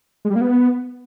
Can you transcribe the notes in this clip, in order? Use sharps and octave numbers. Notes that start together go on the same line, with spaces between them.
G#3
G3
A#3
B3